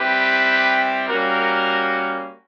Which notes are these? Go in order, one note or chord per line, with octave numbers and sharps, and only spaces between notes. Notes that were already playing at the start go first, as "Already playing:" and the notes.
Already playing: G3 C4 E4 G4 B4
G3 A#3 C#4 F#4 A#4